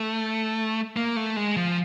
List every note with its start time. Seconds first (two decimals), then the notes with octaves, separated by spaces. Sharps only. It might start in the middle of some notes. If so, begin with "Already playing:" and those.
Already playing: A3
0.96 A#3
1.16 A3
1.36 G#3
1.57 F3